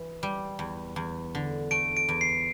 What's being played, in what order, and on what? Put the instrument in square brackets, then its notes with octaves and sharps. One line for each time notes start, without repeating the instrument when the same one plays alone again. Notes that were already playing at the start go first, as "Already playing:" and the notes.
Already playing: [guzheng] E3
G3
E2
E2
D3
[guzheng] A3 [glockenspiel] D7
[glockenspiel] D7
[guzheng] E2
[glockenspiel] C7